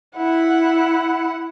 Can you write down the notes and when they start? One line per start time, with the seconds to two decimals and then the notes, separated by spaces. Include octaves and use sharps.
0.17 E4 F#5